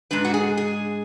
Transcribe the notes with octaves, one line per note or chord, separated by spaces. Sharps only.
G#2 G#3 D4 B4
F#4
G#4
G#4